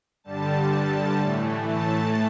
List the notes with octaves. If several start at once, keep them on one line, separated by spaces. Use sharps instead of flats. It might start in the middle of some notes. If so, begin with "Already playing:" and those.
G2 D3 G3 A5
A2 E3 A3
A5